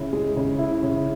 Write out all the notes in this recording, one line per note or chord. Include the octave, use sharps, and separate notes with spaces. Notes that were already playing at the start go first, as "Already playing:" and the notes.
Already playing: C#3 E4
G#3
C#3
E4
C#3